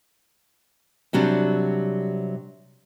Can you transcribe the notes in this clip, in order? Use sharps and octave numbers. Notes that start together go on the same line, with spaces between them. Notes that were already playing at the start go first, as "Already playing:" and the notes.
C3 F#3 G3 D4